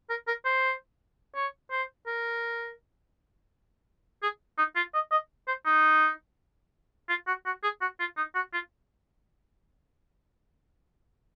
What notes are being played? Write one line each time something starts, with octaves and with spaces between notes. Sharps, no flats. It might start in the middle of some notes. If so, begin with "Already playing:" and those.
A#4
A#4
C5
C#5
C5
A#4
G#4
D#4
F4
D#5
D#5
C5
D#4
F4
F#4
F#4
G#4
F#4
F4
D#4
F#4
F4